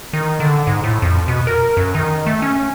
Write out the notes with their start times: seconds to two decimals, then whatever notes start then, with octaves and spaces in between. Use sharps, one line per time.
0.13 D#3
0.40 D3
0.67 G#2
0.84 A2
1.02 F2
1.28 B2
1.47 A#4
1.77 F#2
1.95 D#3
2.26 A3
2.42 C#4